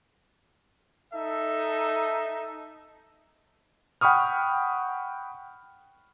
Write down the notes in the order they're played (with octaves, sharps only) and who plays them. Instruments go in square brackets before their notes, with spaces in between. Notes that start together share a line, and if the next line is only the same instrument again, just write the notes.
[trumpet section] D#4 A4 E5
[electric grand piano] F#5 G5 B5 C#6 D#6 F6